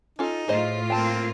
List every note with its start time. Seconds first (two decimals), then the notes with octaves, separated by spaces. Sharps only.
0.19 C#4 D#4 F4 A4
0.48 A2 F4 G#4 C5 D#5
0.90 A#3 C4 G5 A5